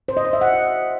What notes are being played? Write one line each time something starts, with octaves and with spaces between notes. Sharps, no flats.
C5
D#5
C5
E5
F#5